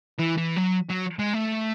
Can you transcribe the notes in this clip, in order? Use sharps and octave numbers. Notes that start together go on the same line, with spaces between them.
E3
E3
F#3
F#3
G#3
A3